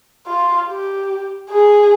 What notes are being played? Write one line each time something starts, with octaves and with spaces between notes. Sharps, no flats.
F4
G4
G#4